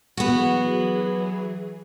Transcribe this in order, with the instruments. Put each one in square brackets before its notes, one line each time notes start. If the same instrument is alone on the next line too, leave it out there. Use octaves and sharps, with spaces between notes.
[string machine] E3 F#3 G#4 [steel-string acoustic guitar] B3 F#4